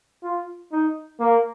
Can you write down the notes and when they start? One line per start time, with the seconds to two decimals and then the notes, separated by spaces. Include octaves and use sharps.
0.23 F4
0.72 D#4
1.20 A#3